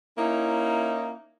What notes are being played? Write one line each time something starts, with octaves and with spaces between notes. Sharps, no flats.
A#3 C#4 D#4 E4